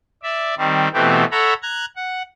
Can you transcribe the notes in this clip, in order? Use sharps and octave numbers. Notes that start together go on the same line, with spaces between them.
D5 E5
D#3 G3 C4
B2 E3 A3 B3 C4 G4
A4 C#5 E5 F#5 A#5 B5
A#5 F#6 G#6
F#5